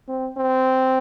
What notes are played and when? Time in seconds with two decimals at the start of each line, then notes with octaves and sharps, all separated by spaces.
0.08 C4
0.37 C4